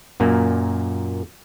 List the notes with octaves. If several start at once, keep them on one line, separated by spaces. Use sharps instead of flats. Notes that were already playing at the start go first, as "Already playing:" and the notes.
F#2 A#2 A#3